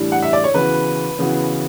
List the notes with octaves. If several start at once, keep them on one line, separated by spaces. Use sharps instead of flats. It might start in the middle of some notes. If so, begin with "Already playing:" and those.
Already playing: A2 E3 G3 D4 G4
F#5
E5
D5
C#5
C#3 E3 B3 F#4 B4
C#3 E3 B3 F#4